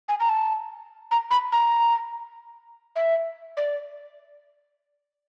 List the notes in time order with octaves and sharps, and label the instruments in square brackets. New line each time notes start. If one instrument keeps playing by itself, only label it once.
[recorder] G#5
A#5
A5
A#5
B5
A#5
E5
D5